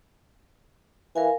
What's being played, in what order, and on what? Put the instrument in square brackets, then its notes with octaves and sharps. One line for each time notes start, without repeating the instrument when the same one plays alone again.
[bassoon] E3 [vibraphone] A#4 F5 G#5